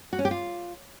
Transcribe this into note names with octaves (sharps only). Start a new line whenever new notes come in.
F#4
C#4
G4
F4